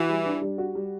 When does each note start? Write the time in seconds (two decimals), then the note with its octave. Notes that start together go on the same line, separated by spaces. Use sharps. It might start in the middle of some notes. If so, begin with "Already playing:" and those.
Already playing: E3 F#4
0.09 G3
0.26 D4
0.42 G3
0.58 F#4
0.75 G3